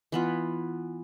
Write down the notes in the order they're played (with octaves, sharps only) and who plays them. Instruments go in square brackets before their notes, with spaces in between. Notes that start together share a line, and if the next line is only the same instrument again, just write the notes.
[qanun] E3 B3 F4